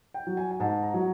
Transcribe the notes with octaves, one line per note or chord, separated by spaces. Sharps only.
G5
F#3
G#5
G#5
G#2 A5
A#5
F#3